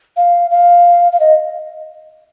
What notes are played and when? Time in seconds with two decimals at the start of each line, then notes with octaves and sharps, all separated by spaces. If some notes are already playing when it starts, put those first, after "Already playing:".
0.17 F5
0.51 F5
1.12 F5
1.20 D#5